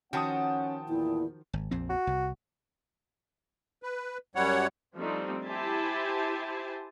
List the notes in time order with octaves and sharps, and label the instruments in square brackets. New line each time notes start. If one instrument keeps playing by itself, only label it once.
[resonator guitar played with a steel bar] D#3 F3 F#4 [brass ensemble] C#4 F#5 [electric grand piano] G5 A5 D#6
[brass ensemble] E2 A#2 [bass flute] E4
[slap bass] G#1
A#1 F2 C4
[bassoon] F#4
[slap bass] C2
[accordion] B4
F#2 G3 C#5 F#5
[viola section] F3 G3 A3 C4 D4 D#4
E4 G4 C5 G#5 A5